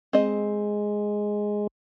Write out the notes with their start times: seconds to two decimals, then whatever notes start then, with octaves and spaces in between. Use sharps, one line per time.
0.13 G#3 C4 D#5